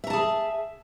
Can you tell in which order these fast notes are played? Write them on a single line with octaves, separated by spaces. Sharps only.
E5 A#5 A5 G#4